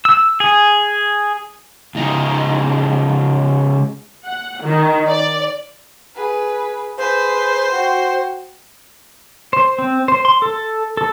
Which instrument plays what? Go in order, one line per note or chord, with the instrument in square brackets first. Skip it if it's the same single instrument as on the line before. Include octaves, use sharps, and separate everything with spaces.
[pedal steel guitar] E6
G#4
[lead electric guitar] C#2 D#4
[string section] F#5
D#3
D5
[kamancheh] G#4 B4
[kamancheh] G#4 B4 [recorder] C5
[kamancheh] F#4 G5
[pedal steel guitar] C5
C4
C5
C6
A4
A4